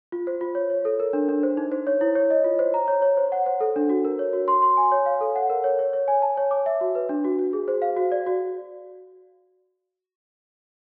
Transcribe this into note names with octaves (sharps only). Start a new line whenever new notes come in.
F4
C5
F4
C#5
C#5
A4
A#4
D4
D4
C5
D#4
C5
C#5
E4
C#5
D#5
F4
C5
A#5
C#5
C#5
C5
F#5
C5
A4
D4
F#4
A#4
C#5
F#4
C6
C6
G#5
C#5
F5
A4
F#5
A#4
C#5
C#5
C#5
G#5
A5
C#5
D6
E5
F#4
B4
D4
F#4
F#4
G#4
C5
F5
F#4
D5
F#4